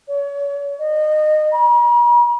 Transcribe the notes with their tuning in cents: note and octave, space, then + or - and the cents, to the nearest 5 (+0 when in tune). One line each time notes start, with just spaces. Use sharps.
C#5 +35
D#5 -25
A#5 +45